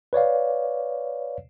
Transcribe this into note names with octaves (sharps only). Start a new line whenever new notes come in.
B4 C#5 D5 F5